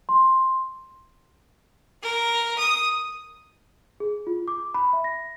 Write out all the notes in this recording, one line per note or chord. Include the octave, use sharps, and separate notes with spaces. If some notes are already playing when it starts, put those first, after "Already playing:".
C6
A#4
D#6
G#4
F4
D6
B5
E5
A#6